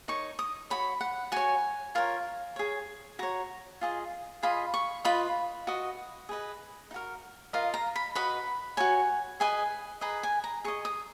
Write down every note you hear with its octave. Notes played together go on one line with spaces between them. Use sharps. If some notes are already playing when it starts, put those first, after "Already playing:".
D#4 A#4 C#5 C#6
D#6
F#4 C#5 B5
F#5
F#4 C#5 G#5
F4 A#4 C#5
G#4 C#5
F#4 C#5 A#5
F4 G#4 D#5
F4 G#4 D#5 B5
C#6
F4 B4 D#5 B5
F#4 B4 D#5
G#4 B4 D#5
D#4
F#4 A#4
F4 A#4 D#5 F5
A#5
B5
F#4 B4 D#5 B5
F#4 C#5 G#5
G#4 B4 D#5 G#5
G#4 B4 D#5 A#5
G#5
A#5
G#4 D#5 C#6
D#6